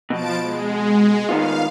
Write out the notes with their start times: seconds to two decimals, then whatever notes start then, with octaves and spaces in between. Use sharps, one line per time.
0.10 B2 F3 A5 D7
0.40 G#3
1.29 D#3 B3 F4 F5